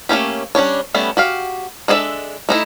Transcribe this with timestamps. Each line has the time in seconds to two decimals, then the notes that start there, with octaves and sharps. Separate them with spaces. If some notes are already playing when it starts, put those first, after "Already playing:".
0.09 A3 A#3 C#4 G4
0.55 G3 C#4 D4 C#5
0.94 G3 A3 B3 C#4
1.17 F#4 G4 F5
1.88 G#3 D4 G#4 A4 E5
2.49 A3 D#4 E4